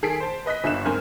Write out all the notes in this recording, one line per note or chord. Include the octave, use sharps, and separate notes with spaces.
D#3 G#4 A4 B6 C7 D7
C5 A5
B4 D#5 F#6 B6
G1 G2 E5 F#6 E7
G#2 C4 A#4 G#5 F6